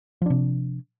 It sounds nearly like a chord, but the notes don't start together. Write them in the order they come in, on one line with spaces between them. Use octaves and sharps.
F3 D4 C3